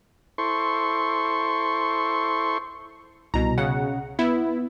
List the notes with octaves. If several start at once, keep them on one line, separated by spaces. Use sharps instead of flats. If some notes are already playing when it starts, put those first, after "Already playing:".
E4 A4 C5 C6 C#6
C2 B2 A#5
C#3 F#5
B3 E4